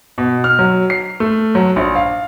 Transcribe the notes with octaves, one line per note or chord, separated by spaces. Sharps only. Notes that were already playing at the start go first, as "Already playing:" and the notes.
B2
F6
F#3
C7
A3
F#3
A#1
F5